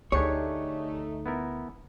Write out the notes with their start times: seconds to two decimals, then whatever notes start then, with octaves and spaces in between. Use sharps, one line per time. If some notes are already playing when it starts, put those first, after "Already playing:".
0.12 D2 A3 D4 D#4 G4 G#4 C#5
1.26 B3 E4 A#4